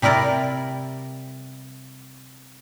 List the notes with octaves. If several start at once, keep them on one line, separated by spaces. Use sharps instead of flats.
C3 G3 E4 A#4 D5